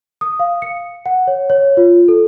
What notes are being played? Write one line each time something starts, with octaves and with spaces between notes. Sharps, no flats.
D#6
F5
C#7
F#5
C#5
C#5
F4
A4